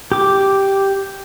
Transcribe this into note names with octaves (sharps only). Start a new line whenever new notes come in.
G4 D6